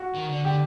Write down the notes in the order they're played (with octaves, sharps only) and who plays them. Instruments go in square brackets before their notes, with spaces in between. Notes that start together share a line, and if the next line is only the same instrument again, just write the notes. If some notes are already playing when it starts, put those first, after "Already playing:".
Already playing: [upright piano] F#4
[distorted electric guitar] D#3
D3
[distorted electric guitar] D3 [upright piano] G4